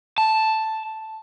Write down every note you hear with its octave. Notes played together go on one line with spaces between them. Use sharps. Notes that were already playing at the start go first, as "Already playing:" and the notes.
A5